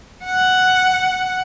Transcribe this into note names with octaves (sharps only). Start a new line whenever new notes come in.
F#5